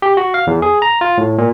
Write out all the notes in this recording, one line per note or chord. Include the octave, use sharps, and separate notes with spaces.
G4
F#4
F5
E2
G#4
A#5
F4
A2
A#2